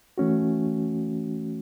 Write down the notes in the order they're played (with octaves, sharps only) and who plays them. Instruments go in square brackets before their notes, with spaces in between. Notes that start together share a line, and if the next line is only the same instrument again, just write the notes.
[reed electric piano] E3 A3 C#4 F#4